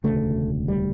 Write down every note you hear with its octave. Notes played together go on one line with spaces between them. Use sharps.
E1 D2 C#3 A3
G3